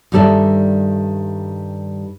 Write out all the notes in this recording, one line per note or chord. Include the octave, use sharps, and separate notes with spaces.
G2 D#3 G3 A4 D5 E5